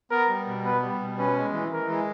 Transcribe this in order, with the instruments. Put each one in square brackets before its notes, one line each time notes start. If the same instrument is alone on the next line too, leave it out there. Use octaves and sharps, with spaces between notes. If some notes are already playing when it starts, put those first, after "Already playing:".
[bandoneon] B3 [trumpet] A#4
[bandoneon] G3
B2
[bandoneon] B3 [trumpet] B4
[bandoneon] G3
B2
[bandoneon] C#4 [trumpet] B4
[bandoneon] G#3
E3
[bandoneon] E3 [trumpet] A#4
[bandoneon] G#3